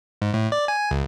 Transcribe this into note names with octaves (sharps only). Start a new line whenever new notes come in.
G#2
A2
D5
G#5
C#2